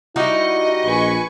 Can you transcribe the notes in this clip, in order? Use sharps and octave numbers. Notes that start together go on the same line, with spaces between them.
G3 D#4 E4 F#4 D#5
A#1 B4 G#5 C#6